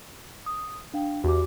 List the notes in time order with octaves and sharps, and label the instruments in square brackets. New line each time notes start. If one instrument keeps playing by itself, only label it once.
[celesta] D#6
D4 F5 G5
[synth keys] E2 [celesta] F#4 G4 D6